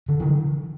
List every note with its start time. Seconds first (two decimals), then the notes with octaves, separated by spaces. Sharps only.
0.09 D3
0.20 E3